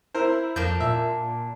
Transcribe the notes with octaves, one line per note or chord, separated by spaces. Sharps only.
E4 A#4 C5
F2 A#3 D4 G6
A#2 E5